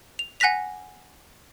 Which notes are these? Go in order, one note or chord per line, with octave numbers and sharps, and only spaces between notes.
F7
F#5 G#5 F#6 A#6 B6 F7